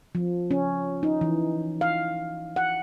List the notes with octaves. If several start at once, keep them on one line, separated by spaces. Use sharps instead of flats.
F3
C#4
D#4
E3
F5
F#5